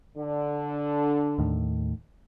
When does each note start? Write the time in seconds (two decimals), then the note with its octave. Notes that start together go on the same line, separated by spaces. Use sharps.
0.17 D3
1.38 D#2 A2